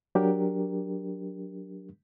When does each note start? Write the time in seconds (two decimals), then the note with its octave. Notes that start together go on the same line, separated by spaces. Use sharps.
0.15 F#3 D4 G4 A#4